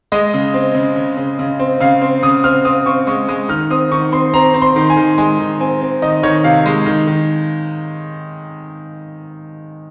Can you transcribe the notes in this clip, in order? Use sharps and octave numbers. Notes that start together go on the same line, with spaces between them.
G#3 D#5
C#3
C4
C#3
C#3
C#3
C#3
C4
C#3 F5
C4
C#3 D#6
C4 F6
C4 D#6
C4 C#6
G#3 C#6
G#3 D#6
D#3 F6
C4 D#6
D#3 C#6
C4 C6
C4 A#5
C4
C6
D#3
G#5
D#3
G#3 G#5
D#3
C4 G#5
C4
D#3 D#5
D#3 C#5
C3 F5
G#3
D#3
D#3